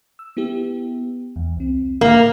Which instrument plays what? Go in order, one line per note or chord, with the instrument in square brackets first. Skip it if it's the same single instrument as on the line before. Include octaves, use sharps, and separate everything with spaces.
[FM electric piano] E6
B3 E4 G4
E2
C2 C4
[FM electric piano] A2 [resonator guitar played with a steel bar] A#3